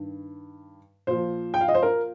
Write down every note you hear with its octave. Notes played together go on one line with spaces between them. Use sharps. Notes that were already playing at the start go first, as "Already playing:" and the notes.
Already playing: G2 D#3
A#2 F3 C5
G5
F5
D#5
C5
A#4